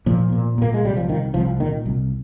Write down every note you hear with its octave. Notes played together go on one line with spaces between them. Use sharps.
A#2 F3
A#2
A#2 A#3
G#3
C2 G3
F3
C2 D#3
C2 F3
A#2 D#3
C2